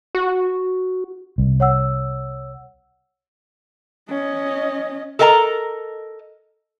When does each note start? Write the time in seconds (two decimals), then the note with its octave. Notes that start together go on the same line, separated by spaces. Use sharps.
0.15 F#4
1.38 C2
1.60 C#5 F#5 E6
4.09 C#4 D#5
5.19 A4 A#4 D#5 G#5 A#5